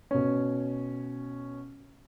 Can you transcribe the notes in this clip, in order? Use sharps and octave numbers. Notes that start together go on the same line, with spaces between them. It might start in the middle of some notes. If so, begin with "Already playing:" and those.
B2 C#4